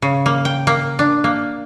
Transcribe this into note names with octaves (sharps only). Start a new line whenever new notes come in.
C#3
A#3
G5
A#3
D4
A#3